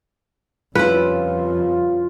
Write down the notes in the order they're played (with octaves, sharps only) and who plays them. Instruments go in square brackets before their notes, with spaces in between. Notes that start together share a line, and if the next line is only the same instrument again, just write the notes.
[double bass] F2 C#3 [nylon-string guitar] G3 C#4 E4 [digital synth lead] F4 [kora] B4